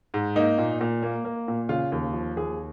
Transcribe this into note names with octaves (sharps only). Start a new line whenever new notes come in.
G#2
A#3 D#4
A#2
A#2
A#3
A#3
A#2
C#3 F4
D#2
F3
D#2 G#4